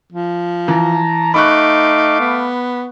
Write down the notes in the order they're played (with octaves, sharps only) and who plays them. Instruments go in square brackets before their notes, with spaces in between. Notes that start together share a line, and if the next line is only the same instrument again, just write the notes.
[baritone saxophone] F3
[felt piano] E3 [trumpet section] A5 A#5
[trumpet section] A3 F5 D6 [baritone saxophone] D#4 [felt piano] B5 C#6 F#6
[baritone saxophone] B3